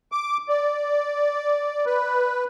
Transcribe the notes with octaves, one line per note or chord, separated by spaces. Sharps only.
D6
D5
B4